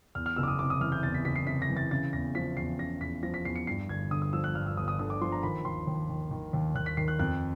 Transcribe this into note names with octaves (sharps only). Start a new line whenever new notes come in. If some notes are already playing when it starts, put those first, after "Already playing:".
E2 F6
F6
F#1 E6
D6
D#6
C3 D6
D#6
E3 F6
G6
E2 A6
B6
F#1 B6
C7
C3 B6
A#6
E3
A6
C#3 A6
E2 A#6
F3 B6
E2 C7
C#3 A#6
E2 B6
F3 A#6
B6
E2 C7
C#7
G2 C7
G1 G#6
D3 D#6
D#6
F3 E6
F#6
G2 F6
E6
G1 D#6
D#6
D3 D#6
D6
F3 C6
A#5
D#3 B5
D#2 C6
D#2
D#3
D#3
D#2
D#2 F#6
B6
D#3 C7
F#6
F2 F#6